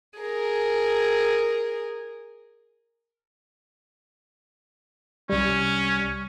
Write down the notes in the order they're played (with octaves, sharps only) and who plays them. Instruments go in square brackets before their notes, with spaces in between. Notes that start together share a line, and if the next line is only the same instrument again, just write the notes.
[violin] G#4 A#4
[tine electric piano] C2 G3 [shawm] C#4